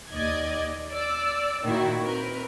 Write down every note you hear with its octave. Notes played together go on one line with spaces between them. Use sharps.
D#2 D5 D#5 G#6
D5 E6
A#2 D#3 E4 F#4
C4 A#4 B4